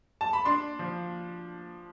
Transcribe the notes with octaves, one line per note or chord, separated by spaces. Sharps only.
A5
B5
D4 C6
F3